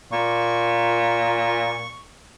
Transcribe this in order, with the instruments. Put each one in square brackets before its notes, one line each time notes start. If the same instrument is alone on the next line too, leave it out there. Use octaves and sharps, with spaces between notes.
[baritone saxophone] A#2 [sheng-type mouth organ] C#6